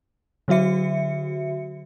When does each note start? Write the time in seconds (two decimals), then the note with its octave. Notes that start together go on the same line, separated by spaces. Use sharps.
0.48 D3 F#3 F#4 E5 C#7